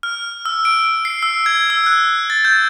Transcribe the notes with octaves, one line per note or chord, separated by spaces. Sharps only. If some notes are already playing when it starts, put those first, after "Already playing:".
F6
E6
D7
C7
E6
G#6
E6
F#6
A6
G6